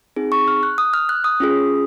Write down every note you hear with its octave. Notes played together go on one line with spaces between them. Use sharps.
C4 D#4 G#4
C#6
F6
F#6
D#6
F6
F#6
D#6
C#4 F4 G#4